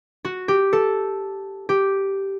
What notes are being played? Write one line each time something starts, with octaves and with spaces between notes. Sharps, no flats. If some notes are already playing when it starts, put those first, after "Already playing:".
F#4
G4
A4
G4